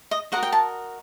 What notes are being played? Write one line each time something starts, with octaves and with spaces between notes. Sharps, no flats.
D#5
F#4 A#4 D#5 F#5
G5
A5